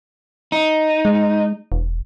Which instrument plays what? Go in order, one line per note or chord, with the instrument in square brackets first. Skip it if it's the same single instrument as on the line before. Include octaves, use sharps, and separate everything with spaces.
[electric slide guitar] D#4
[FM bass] G#3
E1